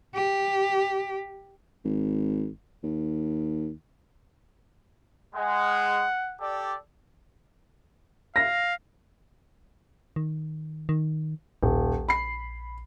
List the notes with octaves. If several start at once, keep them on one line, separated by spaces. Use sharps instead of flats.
G4
G#1
D#2
G#3 F#5
G4 A4 D5
F5 A#6
D#3
D#3
D#1 A#1
B5 C7